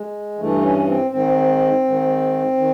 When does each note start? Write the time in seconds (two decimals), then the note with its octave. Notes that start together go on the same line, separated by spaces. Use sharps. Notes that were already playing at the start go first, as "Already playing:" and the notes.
Already playing: G#3
0.38 G2 E3 A3
0.62 C#4
0.87 C4
1.11 G#2 D#3 C4
1.84 G#2 D#3
2.57 D#3